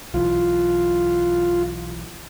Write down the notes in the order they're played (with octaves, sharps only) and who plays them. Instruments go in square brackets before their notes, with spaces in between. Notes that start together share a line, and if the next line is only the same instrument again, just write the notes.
[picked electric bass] B1 E3 [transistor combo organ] F4